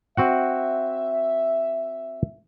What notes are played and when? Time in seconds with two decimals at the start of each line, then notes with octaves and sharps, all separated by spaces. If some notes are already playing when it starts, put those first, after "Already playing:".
0.17 C4 F#4 E5 F#5